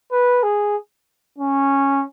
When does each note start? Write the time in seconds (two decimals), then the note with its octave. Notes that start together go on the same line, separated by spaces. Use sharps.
0.12 B4
0.43 G#4
1.39 C#4